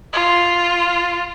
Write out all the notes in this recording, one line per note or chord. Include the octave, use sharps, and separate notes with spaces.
F4